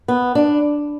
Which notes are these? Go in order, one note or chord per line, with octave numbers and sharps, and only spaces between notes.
B3
D4